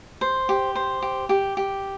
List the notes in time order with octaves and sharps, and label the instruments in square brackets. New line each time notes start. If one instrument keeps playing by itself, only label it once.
[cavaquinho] C5
G4
C5
G4
G4
G4